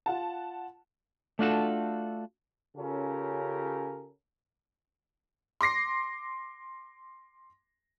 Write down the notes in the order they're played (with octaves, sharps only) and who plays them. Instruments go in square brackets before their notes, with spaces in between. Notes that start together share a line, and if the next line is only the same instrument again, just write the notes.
[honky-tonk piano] F4 F#5 A5
[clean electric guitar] A3 D4 F4 F#4 A4
[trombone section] C#3 C#4 F4 G4 A4 A#4
[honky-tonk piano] C6 D6 A#6 C7